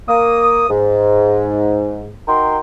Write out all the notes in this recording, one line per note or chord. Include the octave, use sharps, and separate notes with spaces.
A#3 D#6
G#2
D#4 F#4 A#4 G5 A#5 C6